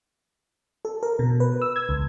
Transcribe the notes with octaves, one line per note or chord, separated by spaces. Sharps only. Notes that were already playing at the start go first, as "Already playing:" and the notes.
A4
A#4
B2
B4
E6
G#6
C#2